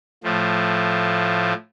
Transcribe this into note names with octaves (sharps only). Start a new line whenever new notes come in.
A2 F3 A3